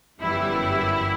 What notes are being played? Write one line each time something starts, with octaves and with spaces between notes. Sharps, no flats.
G1 F#2 E3 G3 E4